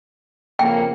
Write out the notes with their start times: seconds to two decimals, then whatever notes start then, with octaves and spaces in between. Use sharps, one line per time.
0.59 F2 C#3 A#3 G5